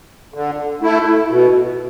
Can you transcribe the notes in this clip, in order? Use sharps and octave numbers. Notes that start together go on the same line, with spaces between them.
D3
A3 E4
B2